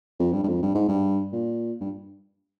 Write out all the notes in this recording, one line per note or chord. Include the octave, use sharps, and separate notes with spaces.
F2
G2
G2
F2
G2
G#2
G2
A#2
G2